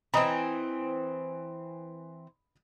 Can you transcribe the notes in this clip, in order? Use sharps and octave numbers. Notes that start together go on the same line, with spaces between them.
E3 C4 D#5 A#5 B5